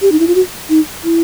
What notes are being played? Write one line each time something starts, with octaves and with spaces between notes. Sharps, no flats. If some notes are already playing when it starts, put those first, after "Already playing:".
G4
D#4
E4
F4
F#4
D#4
E4